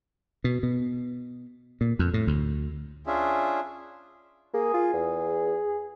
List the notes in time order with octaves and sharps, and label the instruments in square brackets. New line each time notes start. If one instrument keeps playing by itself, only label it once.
[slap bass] B2
B2
A#2
F2
A2
D2
[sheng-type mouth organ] C#4 D4 F4 G#4 E5
[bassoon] A#3 [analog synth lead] G#4
[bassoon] F4
E2